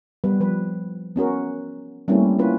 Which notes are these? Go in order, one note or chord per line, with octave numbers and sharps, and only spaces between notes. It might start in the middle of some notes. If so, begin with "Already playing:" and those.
G3 B3 B4
F3 B4
B3 C#4 F#4 A#4
G3 A3 A#3 C4 C#4 E4
A#3 C#4 E4 F4 B4